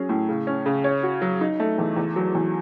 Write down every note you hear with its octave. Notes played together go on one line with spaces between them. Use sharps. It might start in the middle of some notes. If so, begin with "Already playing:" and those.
Already playing: F#3 C#4 G#4
A2
C#3
C#4
C#3
C#5
F#4
F#3
D#4
A3
E2
E2
F#3
E2